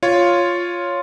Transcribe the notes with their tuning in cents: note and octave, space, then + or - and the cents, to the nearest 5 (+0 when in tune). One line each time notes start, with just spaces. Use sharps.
F4 +0 C#5 +0